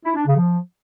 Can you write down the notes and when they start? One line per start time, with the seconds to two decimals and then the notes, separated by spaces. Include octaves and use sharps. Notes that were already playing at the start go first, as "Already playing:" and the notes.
0.05 E4
0.15 D4
0.26 C#3
0.37 F3